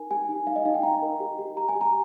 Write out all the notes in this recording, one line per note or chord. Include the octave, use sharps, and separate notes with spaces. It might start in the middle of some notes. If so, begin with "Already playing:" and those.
Already playing: D#4 A#4 G#5
G4 G#5
D#4
D#4 F5
D#5
D#4 F5
G5
D#4 A#5
A#4
G4
G4
G4 A#5
G#5
G4
A#5